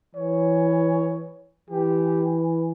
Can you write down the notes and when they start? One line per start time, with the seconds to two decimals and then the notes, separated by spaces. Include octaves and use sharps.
0.15 E3 C#5
1.70 E3 G4